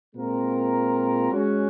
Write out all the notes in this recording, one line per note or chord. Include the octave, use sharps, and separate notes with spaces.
A#2 G#3 C4 F4 A#4
G#3 C#4 F#4